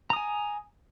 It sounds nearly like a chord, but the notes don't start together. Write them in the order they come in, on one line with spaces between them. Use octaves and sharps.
A#5 D#6 G#5